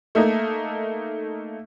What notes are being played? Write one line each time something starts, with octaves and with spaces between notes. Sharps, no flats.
A3 A#3 D#4